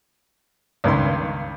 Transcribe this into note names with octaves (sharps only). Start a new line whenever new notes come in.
C#2 G2 D#3 C6